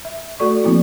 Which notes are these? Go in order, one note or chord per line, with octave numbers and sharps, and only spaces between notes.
E5
A3 F#4 A4 D5 C#6
F3 A#3 C4 E4